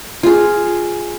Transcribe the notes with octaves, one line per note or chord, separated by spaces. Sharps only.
F4 G#4